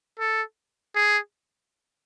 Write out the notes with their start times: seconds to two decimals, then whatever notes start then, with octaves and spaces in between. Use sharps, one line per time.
0.19 A4
0.95 G#4